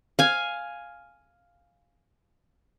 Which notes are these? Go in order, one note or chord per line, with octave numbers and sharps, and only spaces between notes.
F5 G#5